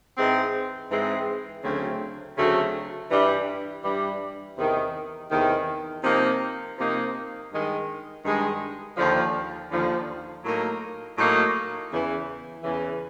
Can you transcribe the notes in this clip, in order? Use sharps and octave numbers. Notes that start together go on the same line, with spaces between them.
G#2 E3 G#3 C4
G#2 E3 G#3 C4
D2 C#3 F#3 A3 C4
D2 C#3 F#3 A3 C4
G2 E3 G3
G2 E3 G3
E2 C3 D#3
E2 C3 D#3
C3 F3 A#3 D#4
C3 F3 A#3 D#4
G2 D#3 G#3
G2 D#3 G#3
D#2 D3 F3
D#2 D3 F3
A2 F#3 A#3 D#4
A2 F#3 A#3 D#4
E2 C#3 E3
E2 C#3 E3